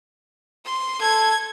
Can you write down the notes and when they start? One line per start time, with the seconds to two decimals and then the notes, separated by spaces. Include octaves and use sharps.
0.65 C6
1.01 A4 G#6